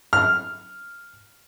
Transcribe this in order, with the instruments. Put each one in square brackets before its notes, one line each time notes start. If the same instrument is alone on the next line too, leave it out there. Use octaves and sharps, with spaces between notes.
[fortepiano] F6